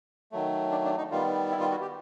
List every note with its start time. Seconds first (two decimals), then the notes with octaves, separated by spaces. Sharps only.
0.32 D#3 F#3 A3
0.71 D4
0.85 D4
0.98 D#4
1.11 D#3 G3 B3 F4
1.52 E4
1.61 F4
1.71 F#4
1.82 G4